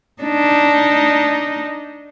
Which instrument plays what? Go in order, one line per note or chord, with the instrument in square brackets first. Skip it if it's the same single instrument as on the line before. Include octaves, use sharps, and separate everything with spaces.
[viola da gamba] D4 D#4